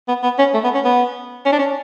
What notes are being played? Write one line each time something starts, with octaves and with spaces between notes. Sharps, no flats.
B3
B3
C#4
A3
B3
C#4
B3
C#4
D4
C#4